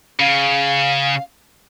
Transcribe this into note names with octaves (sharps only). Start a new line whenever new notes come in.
C#3 F5